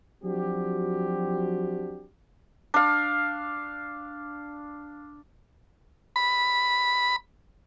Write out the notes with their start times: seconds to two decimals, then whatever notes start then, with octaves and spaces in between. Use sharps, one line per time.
0.23 F3 F#3 C4 D4 F#4 G4
2.74 D4 F5
6.16 B5